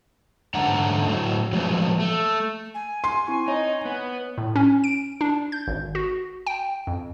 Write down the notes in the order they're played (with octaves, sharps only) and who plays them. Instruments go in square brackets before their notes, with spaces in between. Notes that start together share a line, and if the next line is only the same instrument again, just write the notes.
[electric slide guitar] G#2 D3 A3 D4 F#5 A#5
A2 F#3 A3
F3 F#3 G#3 A3 B4
A3
[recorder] G#5
[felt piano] C6
[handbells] C4 E4 C#6
[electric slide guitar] D#4 [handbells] C#5 D#5
[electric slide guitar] B3
[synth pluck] A2
C#4
D7
D4
G6
G#1
F#4
G5
F2